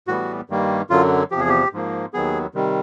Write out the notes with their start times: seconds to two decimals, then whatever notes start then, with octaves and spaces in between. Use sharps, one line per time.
0.08 A2 E3 G3 B3 F#4
0.50 G2 D#3 G3 A#3
0.90 F#2 D3 F#3 F4
1.31 E2 C3 F3 G4
1.40 G#4
1.49 G4
1.73 G#2 F3 A#3
2.13 D#2 D#3 F#3 B3 G#4
2.54 C3 D#3 G3